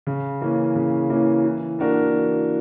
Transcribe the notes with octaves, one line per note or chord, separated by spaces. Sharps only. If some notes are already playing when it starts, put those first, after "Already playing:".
C#3
E3 A#3 C#4
C#3
E3 A#3 C#4
E3
A#3 D4 F#4 A#4
E3